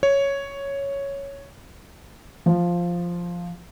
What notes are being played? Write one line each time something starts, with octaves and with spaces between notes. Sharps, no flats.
C#5
F3